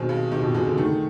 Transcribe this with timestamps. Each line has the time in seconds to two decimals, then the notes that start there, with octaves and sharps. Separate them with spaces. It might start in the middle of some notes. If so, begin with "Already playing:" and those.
Already playing: B2 D#3 G#3 C4
0.09 G2
0.32 C3 D#3
0.43 B2
0.55 B2 G#3
0.67 D3
0.78 D#3 A3